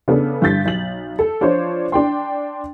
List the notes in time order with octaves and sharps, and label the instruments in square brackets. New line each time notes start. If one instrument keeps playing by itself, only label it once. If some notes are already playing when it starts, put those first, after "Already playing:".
[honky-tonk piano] C#3 B3 D4 A4
G2 D3 G6 A6 B6
B1 F#7
A4
F3 D4 F4 C5 C#5
D4 G5 C6